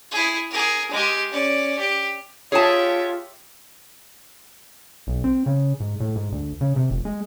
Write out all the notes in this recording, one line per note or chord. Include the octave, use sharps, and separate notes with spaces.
E4 G#4
G#4 A#4
G#3 G4
C#4 D5
G4
F4 G4 G#4 C#5 E5 A5
B1
C4
C#3
G#2
A2
G#2
D2
C#3
C3
F1
G#3